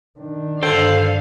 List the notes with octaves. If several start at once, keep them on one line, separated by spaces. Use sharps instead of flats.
D#3 D4
G2 D3 A4 C5 F5 G5